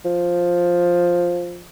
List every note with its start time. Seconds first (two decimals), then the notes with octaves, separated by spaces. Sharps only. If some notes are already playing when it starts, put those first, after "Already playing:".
0.05 F3